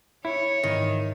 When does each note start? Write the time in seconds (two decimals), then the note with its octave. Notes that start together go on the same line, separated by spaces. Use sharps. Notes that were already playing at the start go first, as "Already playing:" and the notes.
0.25 E4 C#5
0.63 G#2 D#3 E3